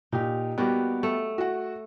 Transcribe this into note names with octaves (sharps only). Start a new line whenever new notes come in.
A#2 D#4 G4
G3 A#3 B3 F#4 G4
A3
F#4 F#5